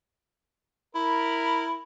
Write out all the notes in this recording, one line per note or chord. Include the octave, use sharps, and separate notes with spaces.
E4 A#4 B5